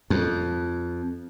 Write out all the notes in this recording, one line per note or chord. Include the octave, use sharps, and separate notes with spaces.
F2